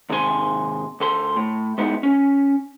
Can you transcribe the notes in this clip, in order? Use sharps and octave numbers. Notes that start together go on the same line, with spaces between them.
D#2 G#2 C3 D#4 G#5 C6
D2 A4 C6
A2
G#3 B3 D#4 E4
C#4